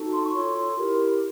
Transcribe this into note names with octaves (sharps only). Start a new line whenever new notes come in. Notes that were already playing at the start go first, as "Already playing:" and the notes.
Already playing: D#4 F#4 A4
C6
C#6
F4 A4 C#5 C6
E4 G4 A#4